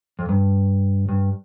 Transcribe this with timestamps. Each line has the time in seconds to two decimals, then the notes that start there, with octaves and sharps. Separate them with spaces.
0.19 F2
0.29 G2
1.09 G2